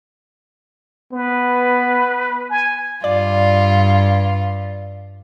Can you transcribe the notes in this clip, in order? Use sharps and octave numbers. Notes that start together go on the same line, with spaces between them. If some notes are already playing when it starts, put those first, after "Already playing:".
B3 B4
G#5
G2 F4 D5